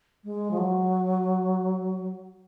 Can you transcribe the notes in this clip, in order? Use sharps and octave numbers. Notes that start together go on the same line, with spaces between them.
G#3
F3
F#3